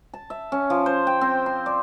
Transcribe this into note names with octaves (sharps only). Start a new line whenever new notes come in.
A5
E5
C#4
F3
C5
G5
C4
C6
D5